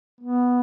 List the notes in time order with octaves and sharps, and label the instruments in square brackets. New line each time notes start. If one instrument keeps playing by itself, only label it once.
[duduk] B3